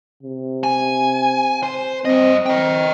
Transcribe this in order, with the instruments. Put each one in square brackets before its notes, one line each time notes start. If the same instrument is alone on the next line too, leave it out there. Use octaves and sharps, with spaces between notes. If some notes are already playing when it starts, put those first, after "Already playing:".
[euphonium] C3
[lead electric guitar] G#5
C5
[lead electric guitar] G2 D#5 [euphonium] C4
[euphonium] C4 [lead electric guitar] D#5 G5